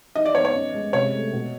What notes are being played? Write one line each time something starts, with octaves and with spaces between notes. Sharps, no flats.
D#4 D#5
D5
B3 C#5
C#5
C#4
G#3
C3 C#5
A3
B2